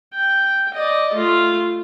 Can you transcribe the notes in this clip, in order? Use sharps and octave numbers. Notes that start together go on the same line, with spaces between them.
G5
D5 D#5
A3 F4